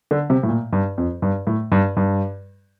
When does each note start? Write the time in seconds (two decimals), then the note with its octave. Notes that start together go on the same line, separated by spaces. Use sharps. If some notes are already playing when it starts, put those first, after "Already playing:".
0.11 D3
0.30 C3
0.43 A2
0.48 A#2
0.73 G2
0.98 F2
1.22 G2
1.47 A2
1.72 G2
1.97 G2